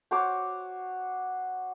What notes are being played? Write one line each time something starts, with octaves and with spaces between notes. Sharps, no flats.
F#4 C5 C#5 D6